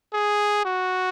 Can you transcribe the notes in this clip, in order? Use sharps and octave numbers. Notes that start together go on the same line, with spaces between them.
G#4
F#4